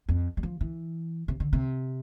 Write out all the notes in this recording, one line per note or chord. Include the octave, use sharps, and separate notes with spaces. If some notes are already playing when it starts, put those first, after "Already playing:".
F2
G3
F3
E3
C3
D3
C3